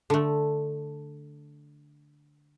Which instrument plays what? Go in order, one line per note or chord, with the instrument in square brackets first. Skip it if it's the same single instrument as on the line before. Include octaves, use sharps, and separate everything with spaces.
[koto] D3 A3